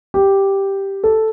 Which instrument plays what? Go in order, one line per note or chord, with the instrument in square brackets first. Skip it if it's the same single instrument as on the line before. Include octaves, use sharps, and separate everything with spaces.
[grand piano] G4
A4